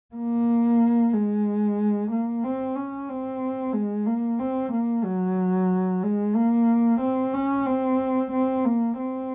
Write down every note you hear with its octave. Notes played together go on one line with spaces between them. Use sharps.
A#3
G#3
A#3
C4
C#4
C4
G#3
A#3
C4
A#3
F#3
G#3
A#3
C4
C#4
C4
C4
A#3
C4